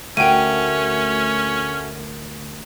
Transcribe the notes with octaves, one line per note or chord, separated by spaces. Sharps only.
D2 A3 C#4 F#4 A#4 G5 D#7